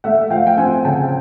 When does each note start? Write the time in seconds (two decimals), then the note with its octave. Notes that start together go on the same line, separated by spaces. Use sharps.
0.04 A3 E5 F#5
0.30 F3 F5 G5
0.47 G5
0.57 C4 F#5 G#5
0.85 C#3 G5 A5